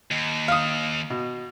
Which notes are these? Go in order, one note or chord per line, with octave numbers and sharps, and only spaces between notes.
D#2
F5 D#6
B2